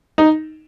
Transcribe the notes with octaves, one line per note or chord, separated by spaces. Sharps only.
D#4